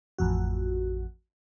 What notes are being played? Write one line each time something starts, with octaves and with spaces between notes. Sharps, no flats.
A1 F2 F#4